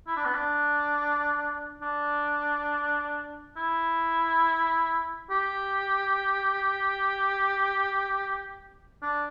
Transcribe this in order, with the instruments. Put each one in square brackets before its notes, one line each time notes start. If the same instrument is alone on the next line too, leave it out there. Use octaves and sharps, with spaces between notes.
[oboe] E4
D4
B3
D4
D4
E4
G4
D4